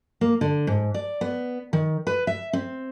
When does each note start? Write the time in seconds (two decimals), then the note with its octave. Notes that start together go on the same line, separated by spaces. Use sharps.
0.21 A#3
0.41 D3
0.67 G#2
0.94 D5
1.21 B3
1.73 D#3
2.07 B4
2.27 E5
2.53 C4